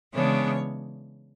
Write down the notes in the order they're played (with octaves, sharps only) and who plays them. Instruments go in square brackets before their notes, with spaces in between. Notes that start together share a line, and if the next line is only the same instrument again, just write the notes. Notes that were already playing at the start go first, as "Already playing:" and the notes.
[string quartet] C#3 E3 G#3 B3 D4 C#5